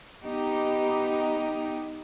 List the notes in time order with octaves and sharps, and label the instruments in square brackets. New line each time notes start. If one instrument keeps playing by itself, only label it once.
[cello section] B3 D#4 G4